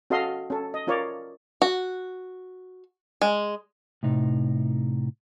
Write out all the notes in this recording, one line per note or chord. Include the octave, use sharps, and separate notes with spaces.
C#4 F#4 A4 D#5 F5 C6
C#4 A4
D#5
C#4 F4 A#4 C#5 D5
F#4
G#3
A2 C3 D#4